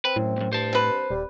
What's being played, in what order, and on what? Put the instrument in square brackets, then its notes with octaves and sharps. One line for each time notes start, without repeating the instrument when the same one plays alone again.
[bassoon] C4 [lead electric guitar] B4
[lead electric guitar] F#2 [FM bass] A2
[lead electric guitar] B1 F#2
[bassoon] G2 [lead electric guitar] C5 A5
[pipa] C4 B4
[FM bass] D#1 [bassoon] G3